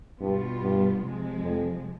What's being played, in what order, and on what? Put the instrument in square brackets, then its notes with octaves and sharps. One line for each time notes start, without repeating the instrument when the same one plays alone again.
[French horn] G2 [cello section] B2 G3 B3 F4
[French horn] G2
[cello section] C3 F3 G#3
[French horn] F2